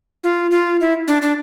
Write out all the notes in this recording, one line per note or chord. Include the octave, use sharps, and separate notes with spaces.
F4
F4
E4
D4
D4